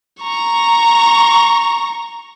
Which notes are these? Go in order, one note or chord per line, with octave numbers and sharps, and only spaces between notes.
A#5 C#6